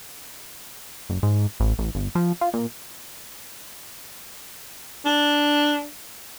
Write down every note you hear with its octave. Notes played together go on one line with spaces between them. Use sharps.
F#1
G#2
A1
A1
G1
F3
F4
A#2
D4